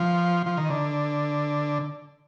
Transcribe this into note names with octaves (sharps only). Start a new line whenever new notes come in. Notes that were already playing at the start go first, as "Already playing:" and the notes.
Already playing: F3
F3
D#3
D3